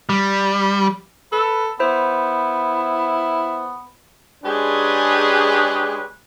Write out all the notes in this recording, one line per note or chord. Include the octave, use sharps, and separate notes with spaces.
G3
A4 B4
B3 E4 C5
G#3 C#4 D4 G4 G#4 B4